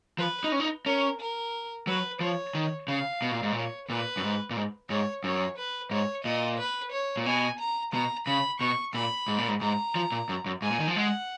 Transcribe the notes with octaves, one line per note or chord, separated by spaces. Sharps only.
F3 B4
D#4
C#4
D#4
C#4 A#4
A#4
F#3 B4
F3 C#5
D#3
C#3 F5
B2
A#2
G#2
A#2 C#5
A#2 B4
F#2
G#2
A#2
G#2
G#2 C#5
F#2 C#5
B4
G#2 C#5
A#2 D#5
B4
C#5
A#2
B2 G#5
A#5
B2 A#5
C#3 B5
B2 C#6
A#2 B5
G#2
A#2
G#2
G#2 A#5
F3
A#2
F#2
F#2
G#2 G#5
A#2
D#3
F3
G#3 F#5